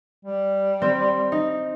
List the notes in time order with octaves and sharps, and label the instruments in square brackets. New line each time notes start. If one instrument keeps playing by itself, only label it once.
[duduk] G3
[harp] C4
D#4